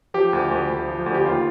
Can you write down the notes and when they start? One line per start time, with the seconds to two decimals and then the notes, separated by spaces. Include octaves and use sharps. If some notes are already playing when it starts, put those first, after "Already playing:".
0.14 F3 G4
0.33 D2
0.51 D2
0.70 D2
0.88 F3
1.06 D2
1.14 G4
1.25 D#2 F4